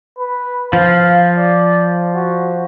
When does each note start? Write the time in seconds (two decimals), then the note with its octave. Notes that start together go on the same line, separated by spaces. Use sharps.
0.19 B4
0.73 F3 F5
1.38 D5
2.15 F#4